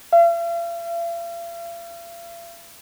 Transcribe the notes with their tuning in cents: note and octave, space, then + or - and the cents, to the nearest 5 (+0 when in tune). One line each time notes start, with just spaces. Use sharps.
F5 -45